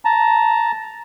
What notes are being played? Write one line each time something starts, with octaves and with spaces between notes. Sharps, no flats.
A5 A#5